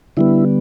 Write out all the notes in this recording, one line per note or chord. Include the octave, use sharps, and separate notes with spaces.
D3 G3 B3 E4